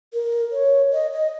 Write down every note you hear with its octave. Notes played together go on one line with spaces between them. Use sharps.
A#4
C#5
D#5
D#5